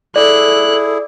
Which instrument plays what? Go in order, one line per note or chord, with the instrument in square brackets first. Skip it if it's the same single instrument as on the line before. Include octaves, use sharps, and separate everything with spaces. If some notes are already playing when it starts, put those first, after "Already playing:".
[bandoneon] E4 G#4 [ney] A4 [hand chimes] D5 [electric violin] F#6